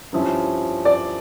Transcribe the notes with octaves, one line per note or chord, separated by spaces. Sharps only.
G2 F3 C#4 E4
D5